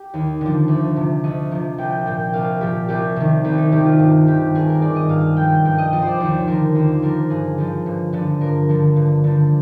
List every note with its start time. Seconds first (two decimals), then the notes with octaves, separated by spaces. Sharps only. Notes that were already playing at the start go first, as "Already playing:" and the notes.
Already playing: G4
0.14 D#2
0.41 D3 F3
0.68 D2
0.96 C3 F3
1.24 D2 D#5
1.51 C3 F3
1.78 C2 G5
1.93 G5
2.06 A#2 F3 G5
2.19 G5
2.33 C2 F5
2.61 A#2 F3 G4
2.89 C2 G4
3.16 C3 D#3
3.44 C2 G4
3.58 D#4
3.72 C3 D#3 G4
3.85 F4
3.99 G2 F4
4.27 D#3 G4
4.55 G2 G#4
4.69 A#4
4.82 D#3 D5
4.96 D#5
5.09 G2 F5
5.37 F3 G5
5.65 G2 G5
5.78 D#5
5.93 F3 D#5
6.02 C5 D5
6.20 D#2 C5
6.47 D3 F3 A#4
6.75 D#2 C5
7.02 D3 F3 A#4
7.30 G2 G#4
7.58 D3 F3
7.86 G2
8.13 D3 F3
8.41 G2 A#4
8.69 D3 F3
8.96 G2
9.24 D3 F3